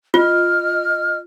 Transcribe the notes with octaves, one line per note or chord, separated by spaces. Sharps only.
F4 D#5 F6